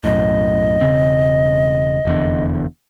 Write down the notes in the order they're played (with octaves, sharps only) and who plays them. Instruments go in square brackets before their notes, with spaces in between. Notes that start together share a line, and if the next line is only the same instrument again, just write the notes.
[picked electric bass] B1 F#2 A2 [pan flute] D#5
[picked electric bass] E1 C#3 C4
F1 E2 D3